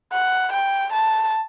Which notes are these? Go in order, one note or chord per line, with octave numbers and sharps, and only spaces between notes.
F#5
G5
A5